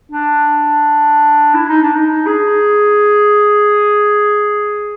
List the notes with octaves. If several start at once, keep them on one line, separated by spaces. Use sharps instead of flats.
D4
E4
D#4
D4
D#4
G#4